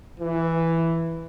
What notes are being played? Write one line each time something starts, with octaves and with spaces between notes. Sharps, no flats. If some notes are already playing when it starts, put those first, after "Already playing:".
E3